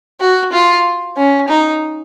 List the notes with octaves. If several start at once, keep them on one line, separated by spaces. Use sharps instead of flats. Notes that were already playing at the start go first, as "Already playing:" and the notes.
F#4
F4
C#4
D#4